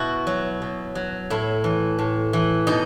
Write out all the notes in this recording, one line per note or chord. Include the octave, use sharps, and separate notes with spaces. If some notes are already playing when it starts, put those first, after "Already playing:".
Already playing: B2 E4 F#4
F#3
B2
F#3
A2 E4
E3
A2
E3
B2 D#4